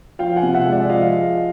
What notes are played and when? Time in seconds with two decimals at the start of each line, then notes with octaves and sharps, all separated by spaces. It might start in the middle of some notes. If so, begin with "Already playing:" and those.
0.19 F3 F5 G5
0.36 F#5 G#5
0.43 C3
0.54 E5 F#5
0.66 G#3
0.72 D5 E5
0.89 F3 D#5 F5